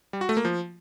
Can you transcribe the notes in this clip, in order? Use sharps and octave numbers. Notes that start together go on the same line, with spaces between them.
G3
F#4
A3
A#3
F3